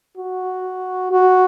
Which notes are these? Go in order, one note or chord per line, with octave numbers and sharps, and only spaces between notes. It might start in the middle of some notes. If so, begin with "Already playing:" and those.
F#4
F#4